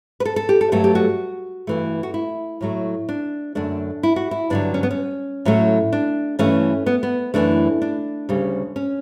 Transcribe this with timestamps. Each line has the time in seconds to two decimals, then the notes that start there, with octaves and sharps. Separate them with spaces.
0.20 B4
0.25 A4
0.36 A4
0.49 G4
0.61 A4
0.72 G2 F#3 A3 A4
0.84 G4
0.95 F#4
1.67 G2 E3 A3
2.03 F#4
2.14 E4
2.61 A2 F#3 A3
3.09 D4
3.55 F#2 D3 A3 D4
4.03 E4
4.16 F#4
4.31 E4
4.50 G2 D3 F#3 D4
4.74 C#4
4.83 B3
4.91 C#4
5.45 A2 F#3 A3
5.93 D4
6.39 G2 E3 A3 C#4
6.86 B3
7.03 B3
7.34 F#2 E3 A3 D4
7.82 D4
8.29 D2 C#3 G3
8.76 C#4